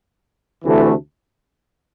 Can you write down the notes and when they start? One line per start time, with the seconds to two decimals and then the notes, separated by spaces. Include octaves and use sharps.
0.64 D2 C3 E3 A3